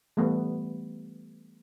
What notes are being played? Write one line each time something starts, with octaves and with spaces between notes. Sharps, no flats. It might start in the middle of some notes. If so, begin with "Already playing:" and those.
E3 G3 A3 B3